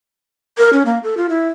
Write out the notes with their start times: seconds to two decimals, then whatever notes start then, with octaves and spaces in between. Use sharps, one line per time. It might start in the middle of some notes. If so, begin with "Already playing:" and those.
0.58 A#4
0.73 C#4
0.86 A#3
1.04 A4
1.17 F4
1.29 E4